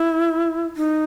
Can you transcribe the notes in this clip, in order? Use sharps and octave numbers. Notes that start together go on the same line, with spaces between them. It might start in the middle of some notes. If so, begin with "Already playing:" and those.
Already playing: E4
D#4